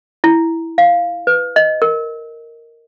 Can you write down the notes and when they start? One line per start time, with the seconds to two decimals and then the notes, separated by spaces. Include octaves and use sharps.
0.24 E4
0.78 F5
1.27 B4
1.56 D#5
1.82 A#4